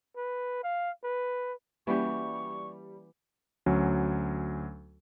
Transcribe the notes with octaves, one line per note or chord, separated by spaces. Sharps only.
B4
F5
B4
E3 G3 A#3 C#4 F#4 G4 C#6
D2 F#3 C#4